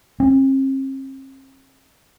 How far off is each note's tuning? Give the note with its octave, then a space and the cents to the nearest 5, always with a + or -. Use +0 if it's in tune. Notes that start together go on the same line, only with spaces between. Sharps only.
C4 +45